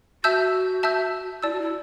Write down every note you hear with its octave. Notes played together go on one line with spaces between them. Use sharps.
F#4 E5 A5 E6 G6
E5 A5 E6 G6
E4 D5 A5 E6
F#4
E4